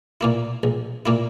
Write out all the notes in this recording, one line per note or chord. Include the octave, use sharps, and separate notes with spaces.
A#2 A#3 E4
A#1
A#2 A#3 E4